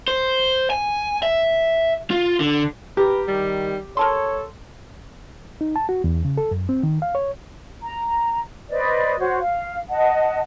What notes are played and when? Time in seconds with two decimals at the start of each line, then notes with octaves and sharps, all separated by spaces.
0.08 C5
0.70 G#5
1.23 E5
2.10 F4
2.40 D3
2.97 G4 A#4 B4
3.28 D#3 G3
3.97 A4 A#4 C#5 A5 C6
5.61 D#4
5.76 A5
5.89 F#4
6.04 E2
6.25 C#3
6.38 A4
6.51 F#2
6.69 C4
6.83 D#3
7.02 F5
7.15 C#5
7.82 A#5
8.70 B4 C5 D5 D#5
9.18 F#4 C5 C#5
9.39 F5
9.90 D#5 F#5 A5